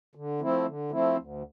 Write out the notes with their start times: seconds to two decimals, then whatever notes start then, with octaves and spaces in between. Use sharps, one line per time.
0.15 D3
0.41 F3 A3 C4 E4
0.66 D3
0.91 F3 A3 C4 E4
1.17 D2